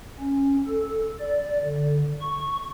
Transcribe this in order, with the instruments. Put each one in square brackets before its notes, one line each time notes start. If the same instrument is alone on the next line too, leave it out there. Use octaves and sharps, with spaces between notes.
[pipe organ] C#4
A4
D5
D3
C#6